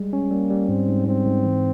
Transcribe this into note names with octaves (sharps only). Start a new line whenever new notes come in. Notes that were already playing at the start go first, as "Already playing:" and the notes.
Already playing: G3 G#3
C#4
G3 A#3
G3
G#2 C4
G#2
G#2 C4
G#2
E3